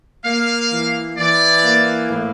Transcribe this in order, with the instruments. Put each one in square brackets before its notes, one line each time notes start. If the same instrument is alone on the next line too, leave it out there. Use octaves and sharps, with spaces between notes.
[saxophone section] A#3 [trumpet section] F5
[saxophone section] E3
[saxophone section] E3 [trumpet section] D5
[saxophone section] A#3
A2